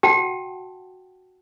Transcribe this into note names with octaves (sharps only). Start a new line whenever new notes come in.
F#4 F#5 G5 A5